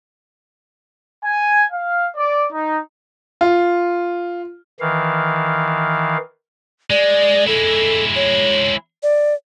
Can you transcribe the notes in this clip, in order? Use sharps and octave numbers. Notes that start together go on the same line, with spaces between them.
G#5
F5
D5
D#4
F4
D#3 E3 F5
G#3 D5
G#3 E4 A4
C#5
D5